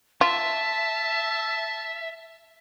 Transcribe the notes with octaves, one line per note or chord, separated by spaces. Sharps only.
F4 E5 A5 B6